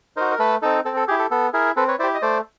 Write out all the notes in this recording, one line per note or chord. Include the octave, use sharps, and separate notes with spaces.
D#4 F#4 A#4 C5
A#4
A3 A4 B4
C4 D#4 A4
C4 A4
A4
E4 G4 G#4
A4
B3 A4
E4 G#4 A#4
C4 A4 B4
B4 C#5
E4 G4 C5 D5
D#5
A3 C5 D5